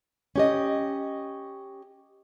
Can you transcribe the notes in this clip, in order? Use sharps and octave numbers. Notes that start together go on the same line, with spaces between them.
C#4 G4 D#5